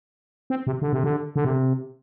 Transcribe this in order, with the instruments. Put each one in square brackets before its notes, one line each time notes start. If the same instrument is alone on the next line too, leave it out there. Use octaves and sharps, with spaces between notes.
[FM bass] C4
C3
D3
C3
D3
D3
C3